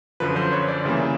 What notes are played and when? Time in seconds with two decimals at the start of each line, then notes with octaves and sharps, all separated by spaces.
0.20 F#2 D3 F3 B4
0.36 C5
0.53 C#5
0.68 D5
0.85 C#3 E3 G3 A#3